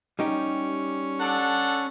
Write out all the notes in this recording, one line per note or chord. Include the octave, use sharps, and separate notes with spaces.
G3 C#4 D#4 G4
D4 A4 F#5